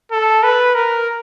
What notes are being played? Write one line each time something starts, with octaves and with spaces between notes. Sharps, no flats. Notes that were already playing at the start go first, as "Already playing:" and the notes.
A4
B4
A#4